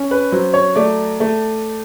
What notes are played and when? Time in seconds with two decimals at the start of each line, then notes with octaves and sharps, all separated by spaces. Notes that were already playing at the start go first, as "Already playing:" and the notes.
Already playing: C#4
0.11 B4
0.32 F#3 C5
0.54 C#5
0.75 A3 D5
1.20 A3